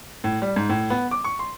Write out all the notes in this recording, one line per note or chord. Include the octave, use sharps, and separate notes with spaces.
A2
G3
G#2
A2
B3
D6
C#6
C6